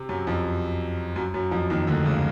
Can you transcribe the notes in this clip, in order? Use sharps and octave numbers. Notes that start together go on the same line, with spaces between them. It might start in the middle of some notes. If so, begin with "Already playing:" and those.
Already playing: C3
F#2 F#3
F2 F3
F#2 F#3
F#2 F#3
F2 F3
D#2 D#3
D2 D3
C#2 C#3